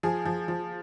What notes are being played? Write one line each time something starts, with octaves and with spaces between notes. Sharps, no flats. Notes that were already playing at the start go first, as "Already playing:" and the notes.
F3 G#4
F3
F3